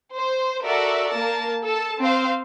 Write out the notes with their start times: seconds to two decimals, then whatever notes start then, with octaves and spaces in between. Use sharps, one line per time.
0.14 C5
0.64 F#4 A4 A#4 D5 E5
1.11 A#3 A#4 A5
1.64 A4 A5
1.99 C4 C5 F5